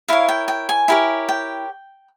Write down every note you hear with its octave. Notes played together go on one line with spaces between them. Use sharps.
E4 A#4 C#5 F5
G5
G5
G#5
E4 G4 A#4 C#5
G5